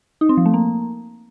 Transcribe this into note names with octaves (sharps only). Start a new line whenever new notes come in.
D#4
C4
F3
A3
A#3